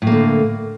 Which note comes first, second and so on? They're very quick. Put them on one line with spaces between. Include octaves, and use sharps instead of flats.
A2 A#3 D3